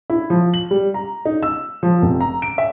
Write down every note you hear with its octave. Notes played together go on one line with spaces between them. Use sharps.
E4
F3
F#7
G3
A#5
D#4
E6
F3
F1
A#5
D7
E5